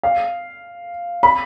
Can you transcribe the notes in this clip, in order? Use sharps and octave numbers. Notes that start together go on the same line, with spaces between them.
F5
B5